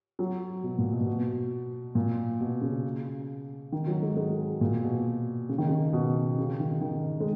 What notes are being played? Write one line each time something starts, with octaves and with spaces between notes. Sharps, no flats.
F#3
B2
A#2
B2
A#2
B2
A#2
B2
C#3
D#3
F#3
G#3
G#3
A#2
B2
C#3
D#3
C#3
B2
C#3
D#3
D#3
G#3